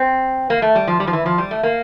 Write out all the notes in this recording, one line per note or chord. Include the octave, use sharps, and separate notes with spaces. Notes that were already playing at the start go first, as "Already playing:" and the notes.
Already playing: C4
A#3
A3
G3
F3
G3
F3
E3
F3
G3
A3
A#3